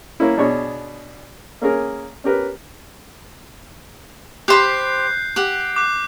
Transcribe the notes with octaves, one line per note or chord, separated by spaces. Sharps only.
A#3 C#4 E4
B2 D4 G#4 C#5
A#3 C#4 G#4 A#4
C#4 G4 A#4 B4
G4 C5 B5 F#6 G6 C7
G4 F#5
D6 F#6